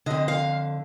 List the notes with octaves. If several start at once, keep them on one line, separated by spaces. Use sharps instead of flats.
F2 D3 D#5
F5